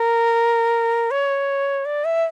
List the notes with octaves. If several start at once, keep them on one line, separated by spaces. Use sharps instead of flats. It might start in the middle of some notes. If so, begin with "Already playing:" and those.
Already playing: A#4
C#5
D5
E5